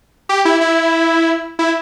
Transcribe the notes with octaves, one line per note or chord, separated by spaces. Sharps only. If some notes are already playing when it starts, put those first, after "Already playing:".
G4
E4
E4
E4